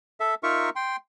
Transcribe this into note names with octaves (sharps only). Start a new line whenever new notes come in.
A4 E5
D#4 F4 A#4 E5 C#6
G5 C6